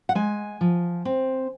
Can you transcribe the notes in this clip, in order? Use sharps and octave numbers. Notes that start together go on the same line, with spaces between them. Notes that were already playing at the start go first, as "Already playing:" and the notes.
F#5
G#3 G#5
F3
C4